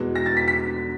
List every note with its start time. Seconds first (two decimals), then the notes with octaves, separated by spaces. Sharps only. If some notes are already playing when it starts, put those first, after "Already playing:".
Already playing: E2 B2 G#3
0.15 A#6
0.26 A6
0.37 B6
0.48 B6